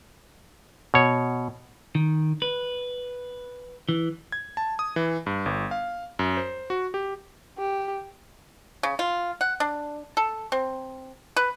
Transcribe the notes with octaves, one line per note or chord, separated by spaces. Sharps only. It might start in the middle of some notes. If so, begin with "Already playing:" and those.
B2 C#5
D#3
B4
E3
G#6
A5
D#6
E3
G2
G1
F5
F#2
C5
F#4
G4
G4
C#3
F4
F#5
D4
A4
C4
B4